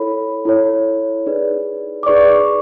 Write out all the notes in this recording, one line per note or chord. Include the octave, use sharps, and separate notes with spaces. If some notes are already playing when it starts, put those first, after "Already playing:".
Already playing: E4 A4 C#5 B5
E4 A4 C#5
D#4 G#4 B4 D5
D6
D#4 G#4 B4 D5 C#6